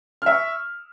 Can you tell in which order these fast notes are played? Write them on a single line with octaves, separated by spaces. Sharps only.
F6 E5 C#6